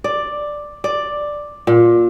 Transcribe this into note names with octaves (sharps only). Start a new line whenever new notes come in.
D5
D5
A#2